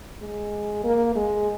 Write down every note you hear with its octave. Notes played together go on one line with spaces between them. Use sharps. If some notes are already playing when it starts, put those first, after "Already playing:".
G#3
A#3
G#3